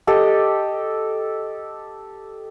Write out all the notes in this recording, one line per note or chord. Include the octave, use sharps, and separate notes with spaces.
G4 A4 D#5